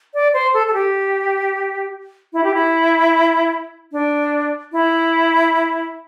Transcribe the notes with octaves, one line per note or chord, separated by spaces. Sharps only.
D5
C5
A4
A4
G4
E4
G4
E4
D4
E4